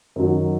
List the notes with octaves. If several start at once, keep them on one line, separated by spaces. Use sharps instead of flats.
F#2 D#3 F#3